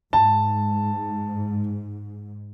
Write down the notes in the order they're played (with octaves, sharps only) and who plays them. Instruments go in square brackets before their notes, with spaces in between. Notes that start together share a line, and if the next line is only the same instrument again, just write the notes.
[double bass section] G#2 [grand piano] A5